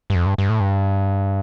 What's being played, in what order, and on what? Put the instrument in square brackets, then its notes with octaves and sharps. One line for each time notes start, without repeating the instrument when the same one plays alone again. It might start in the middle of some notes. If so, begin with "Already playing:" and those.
[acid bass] G2
F2
G2
G2
A2
G2